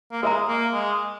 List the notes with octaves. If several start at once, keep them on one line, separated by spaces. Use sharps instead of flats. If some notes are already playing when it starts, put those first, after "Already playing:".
A#3
G#3 A#4 E5 A#5
A#3
G#3